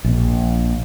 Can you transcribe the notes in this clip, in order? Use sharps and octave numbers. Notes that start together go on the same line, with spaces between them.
A#1